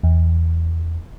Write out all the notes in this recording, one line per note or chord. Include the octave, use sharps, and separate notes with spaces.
E2